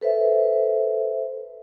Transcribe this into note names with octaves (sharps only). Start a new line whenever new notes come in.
A4 B4 C5 E5